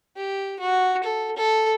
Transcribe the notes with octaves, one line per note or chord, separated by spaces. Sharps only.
G4
F#4
A4
A4